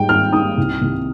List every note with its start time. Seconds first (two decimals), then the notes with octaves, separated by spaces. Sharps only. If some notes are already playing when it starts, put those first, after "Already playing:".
Already playing: G#2 G3 G5
0.09 G#1 F6
0.33 G#2 G3 D#6
0.58 C2
0.81 C3 D#3